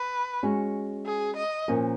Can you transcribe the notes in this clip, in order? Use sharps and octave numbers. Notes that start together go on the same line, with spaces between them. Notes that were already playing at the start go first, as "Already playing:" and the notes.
Already playing: B4
G#3 C#4 F#4
G#4
D#5
A#2 F3 A#3 C#4